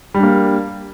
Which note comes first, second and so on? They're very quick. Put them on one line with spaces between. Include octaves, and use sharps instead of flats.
G3 D4 A#3